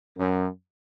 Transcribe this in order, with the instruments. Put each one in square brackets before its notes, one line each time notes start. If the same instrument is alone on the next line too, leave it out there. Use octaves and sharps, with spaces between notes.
[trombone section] F#2